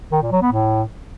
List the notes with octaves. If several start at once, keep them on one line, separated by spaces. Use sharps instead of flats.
D#3
A#2
F#3
B3
A2